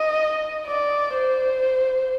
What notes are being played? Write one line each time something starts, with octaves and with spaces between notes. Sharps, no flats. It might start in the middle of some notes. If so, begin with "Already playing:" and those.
Already playing: D#5
D5
C5